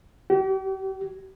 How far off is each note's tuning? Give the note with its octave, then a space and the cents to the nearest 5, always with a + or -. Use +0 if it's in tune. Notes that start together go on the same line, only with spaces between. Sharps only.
G4 -40